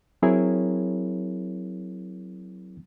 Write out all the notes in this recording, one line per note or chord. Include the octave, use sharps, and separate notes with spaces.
F#3 C4 E4 G#4 A#4 C#5